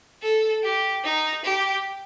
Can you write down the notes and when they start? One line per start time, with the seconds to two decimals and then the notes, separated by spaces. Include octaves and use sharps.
0.22 A4
0.63 G4
1.04 D#4
1.45 G4